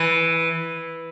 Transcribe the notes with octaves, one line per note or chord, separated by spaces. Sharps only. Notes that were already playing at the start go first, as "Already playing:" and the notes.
Already playing: E3